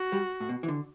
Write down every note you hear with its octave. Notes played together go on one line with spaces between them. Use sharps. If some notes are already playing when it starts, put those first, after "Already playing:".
Already playing: F#4
G3
A2
B2
E3
D3